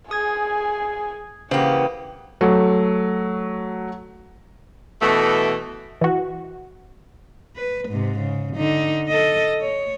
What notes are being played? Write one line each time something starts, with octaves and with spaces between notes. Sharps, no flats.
G#4 G#5 D#6 G#6
C#3 E3 A#3 G4 C5 F#5 D#6
F#3 A3
B2 E3 A3
E3 F#4
B4
G#2 C3
C#3
D3 D#4
A4 D#5
C#5